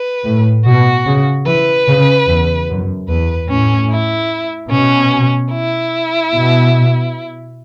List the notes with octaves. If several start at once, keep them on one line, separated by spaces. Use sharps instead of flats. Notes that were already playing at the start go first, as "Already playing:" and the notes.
Already playing: B4
A2
B2 F#4
C#3
E3 B4
C#3
E2
F#2
E2 B4
A2 C#4
E4
B2 C#4
E4
B2